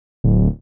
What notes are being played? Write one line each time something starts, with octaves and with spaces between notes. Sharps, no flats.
D1